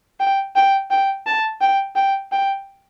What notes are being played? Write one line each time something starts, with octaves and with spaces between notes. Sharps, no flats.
G5
G5
G5
A5
G5
G5
G5